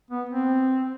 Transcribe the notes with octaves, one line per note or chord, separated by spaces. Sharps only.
B3
C4